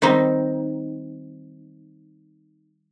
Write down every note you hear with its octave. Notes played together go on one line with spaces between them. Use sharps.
D#3 G3 C4 D#4